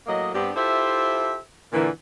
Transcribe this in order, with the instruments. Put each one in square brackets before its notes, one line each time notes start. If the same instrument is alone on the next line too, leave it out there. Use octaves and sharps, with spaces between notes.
[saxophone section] A2 F#3 A#3 D#5
G2 B3 C4 D4 G4
E4 F4 G4 A4 C5 E5
A#2 D3 E3